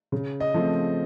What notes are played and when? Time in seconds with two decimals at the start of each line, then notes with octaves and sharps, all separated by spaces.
0.12 C#3
0.40 D#5
0.54 F3 A3 C4